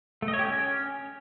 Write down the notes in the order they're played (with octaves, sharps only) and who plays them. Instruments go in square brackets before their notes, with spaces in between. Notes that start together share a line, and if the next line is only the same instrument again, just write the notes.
[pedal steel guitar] A3
D#5
C#5
G4
C#4